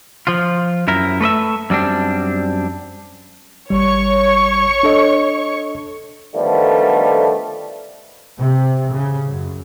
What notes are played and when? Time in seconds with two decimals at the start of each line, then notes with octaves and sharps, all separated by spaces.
0.27 F3 F4
0.88 F#2 E4 A#4
1.21 A3 B4 D#5 E5
1.70 F#2 G3 C4 D4
3.70 G#1 G3 C#5 C#6
4.83 D4 A4 D#5
6.35 D3 D#3 F3 G3 A3 B3
8.39 C3
8.93 C#3
9.27 F#2